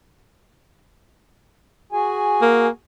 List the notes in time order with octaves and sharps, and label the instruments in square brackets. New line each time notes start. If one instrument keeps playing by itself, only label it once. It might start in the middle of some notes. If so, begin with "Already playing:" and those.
[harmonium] F#4 G#4 G#5
[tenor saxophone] A#3